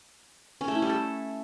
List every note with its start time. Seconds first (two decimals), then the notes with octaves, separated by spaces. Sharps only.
0.61 C#4
0.68 A3
0.75 E4
0.82 G3
0.89 A4